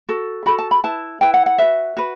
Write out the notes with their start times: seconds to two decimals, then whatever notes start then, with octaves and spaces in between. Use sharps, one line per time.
0.09 F#4 A4
0.46 F#4 A4 B5
0.59 A5
0.71 B5
0.84 E4 B4 A5
1.21 E4 B4 G5
1.34 F#5
1.46 F#5
1.58 F#4 B4 E5
1.97 F#4 B4